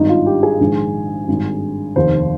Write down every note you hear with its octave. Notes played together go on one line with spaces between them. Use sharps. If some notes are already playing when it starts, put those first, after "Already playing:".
Already playing: G#1 G2 D#3 D#4
F4
G4
G#4
A#1 G#2 D#3
G#1 G2 D#3
F1 D#2 D#3 C5